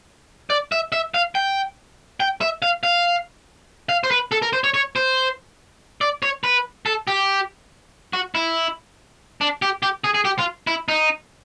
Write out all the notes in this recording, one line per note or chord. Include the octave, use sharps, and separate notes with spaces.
D5
E5
E5
F5
G5
G5
E5
F5
F5
F5
C5
B4
A4
A#4
C5
C#5
C#5
C5
D5
C#5
B4
A4
G4
F#4
E4
D4
G4
G4
G#4
G#4
G4
F4
E4
D#4